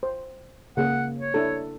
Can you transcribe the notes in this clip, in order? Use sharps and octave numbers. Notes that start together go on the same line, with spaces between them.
C5
C#3 A#3 G#4 F#5
C#5
D4 E4 A4